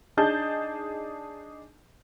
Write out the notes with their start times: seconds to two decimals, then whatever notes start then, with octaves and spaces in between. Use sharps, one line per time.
0.17 D4 D#4 G#4 A5 G6 A6